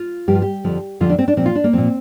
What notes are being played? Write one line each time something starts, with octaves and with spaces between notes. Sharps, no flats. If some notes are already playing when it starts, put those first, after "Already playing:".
Already playing: F4
G2 F3 G4
F4
G4
F2 D3 F3
F2 D3 F3 F4
D4
C4
D4
A#2 F3 C4
F4
D4
A#3
A#2 F3 C4